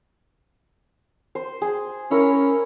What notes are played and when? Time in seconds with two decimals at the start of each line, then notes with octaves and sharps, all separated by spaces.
1.35 C5
1.62 G#4
2.11 C#4 E4 A#4